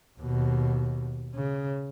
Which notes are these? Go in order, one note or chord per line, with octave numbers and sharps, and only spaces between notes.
D#2 B2
C#3